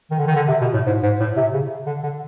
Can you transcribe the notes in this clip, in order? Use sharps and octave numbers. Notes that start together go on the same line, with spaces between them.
D#3
D3
D#3
D3
C3
B2
A2
G#2
G#2
A2
C3
C#3
D3
D3